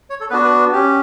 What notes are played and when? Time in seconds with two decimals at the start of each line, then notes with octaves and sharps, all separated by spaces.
0.10 C#5
0.20 A4
0.30 B3 D4 F#4 B4
0.44 B4
0.72 C#4 G4